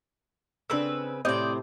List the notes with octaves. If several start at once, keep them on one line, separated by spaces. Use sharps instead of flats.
C#3 C4 D4 B4 E6
A2 C3 C4 D5 D#5 D6 D#6 G6